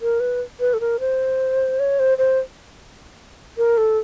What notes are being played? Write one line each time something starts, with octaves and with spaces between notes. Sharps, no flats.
A#4
B4
B4
A4
A#4
C5
C#5
C5
C5
A#4
A4